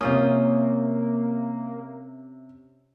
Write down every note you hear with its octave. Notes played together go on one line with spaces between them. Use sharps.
C3 A#3 C#4 F4 C5 D#6